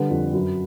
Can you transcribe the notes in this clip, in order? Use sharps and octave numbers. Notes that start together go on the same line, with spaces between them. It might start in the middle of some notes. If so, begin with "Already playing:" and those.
Already playing: D3 G3 B4
F2
F#2